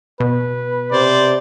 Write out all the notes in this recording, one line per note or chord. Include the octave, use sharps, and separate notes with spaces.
B2 B4
C3 C5 D5